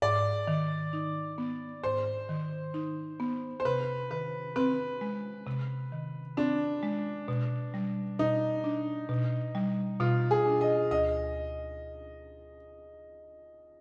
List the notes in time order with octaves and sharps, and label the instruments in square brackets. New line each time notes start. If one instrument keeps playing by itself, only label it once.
[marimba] G#2 [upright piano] D5
[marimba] D#3
D#4
B3
[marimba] G#2 [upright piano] C5
[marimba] D#3
D#4
B3
[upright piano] C5
[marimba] C3 [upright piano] B4
[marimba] D#3 [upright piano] B4
[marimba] C4 [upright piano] B4
[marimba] G#3
C3
D#3
[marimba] C4 [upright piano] D4
[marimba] G#3
B2
G3
[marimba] B2 [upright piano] D#4
[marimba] D4
B2
G3
[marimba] B2 [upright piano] F4
[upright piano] G#4
[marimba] D4
[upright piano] D#5
[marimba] D2 [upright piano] D#5